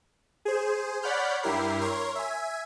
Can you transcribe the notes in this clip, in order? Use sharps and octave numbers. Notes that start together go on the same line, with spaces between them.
G#4 C5
C#5 D5 F#5 B5 F6 G6
G2 E4 G4 A#4 C7
A#4 C#5 C6
E5 G#5